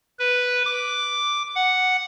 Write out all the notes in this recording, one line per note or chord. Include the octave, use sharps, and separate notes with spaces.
B4
D6
F#5